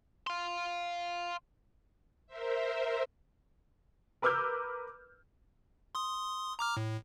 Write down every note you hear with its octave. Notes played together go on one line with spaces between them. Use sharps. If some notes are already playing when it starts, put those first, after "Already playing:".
F5 C6
A#4 C5 E5
A#4 B4 D6 E6 F6 G6
C6 D#6
A#5 D6 F6
A2